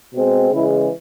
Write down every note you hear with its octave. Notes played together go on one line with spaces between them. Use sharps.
B2 G#3 C4
C#3 E3 G#3 E4